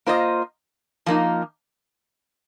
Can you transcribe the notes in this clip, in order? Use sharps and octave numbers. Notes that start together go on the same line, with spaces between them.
A#3 F4 C5 D#5
F3 A#3 D#4